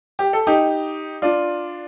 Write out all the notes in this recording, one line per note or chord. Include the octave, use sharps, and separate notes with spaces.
G4
A4
D#4 G4
D4 F4